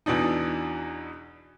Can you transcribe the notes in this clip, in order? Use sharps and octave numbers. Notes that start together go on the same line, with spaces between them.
E2 B2 E3 D4 D#4